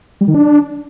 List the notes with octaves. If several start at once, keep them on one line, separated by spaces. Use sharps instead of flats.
G3
D#3
D4